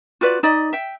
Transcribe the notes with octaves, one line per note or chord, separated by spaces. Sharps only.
F4 F#4 B4 D5
D#4 D5 D#5
E5 G5